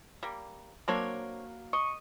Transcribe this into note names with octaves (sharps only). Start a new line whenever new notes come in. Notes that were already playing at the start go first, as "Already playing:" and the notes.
G3 A#3
F#3 A#3 C4 D4 C#5
D#5 C#6